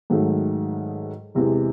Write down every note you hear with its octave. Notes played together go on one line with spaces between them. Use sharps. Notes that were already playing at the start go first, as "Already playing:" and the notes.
G#2 D#3 F#3 A3
E2 C3 E3 G#3